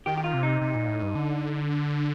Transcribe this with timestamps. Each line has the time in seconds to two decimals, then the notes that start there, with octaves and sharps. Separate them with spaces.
0.06 D#3 G4
0.17 G4
0.24 F4
0.34 C3
0.43 D#4
0.61 C3
0.75 A#2
0.88 A2
1.02 G2
1.15 D3